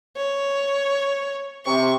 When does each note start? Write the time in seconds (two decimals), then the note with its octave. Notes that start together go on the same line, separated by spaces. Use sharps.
0.16 C#5
1.65 C3 C#6